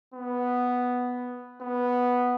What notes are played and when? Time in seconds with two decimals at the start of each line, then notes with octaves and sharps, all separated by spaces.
0.14 B3
1.61 B3